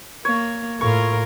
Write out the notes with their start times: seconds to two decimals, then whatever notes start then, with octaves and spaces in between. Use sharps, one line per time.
0.25 A#3 C#5
0.81 A2 F4 A#4 C#6